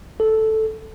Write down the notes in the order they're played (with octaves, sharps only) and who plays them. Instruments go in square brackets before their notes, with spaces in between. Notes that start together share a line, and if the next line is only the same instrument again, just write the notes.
[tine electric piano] A4